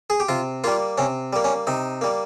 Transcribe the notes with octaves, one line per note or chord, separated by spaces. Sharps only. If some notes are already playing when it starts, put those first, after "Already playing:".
G#4
G4
C3 F4
G3 A#3 F4
C3 C#4
G3 A#3
C#4
C3 D#4
G3 A#3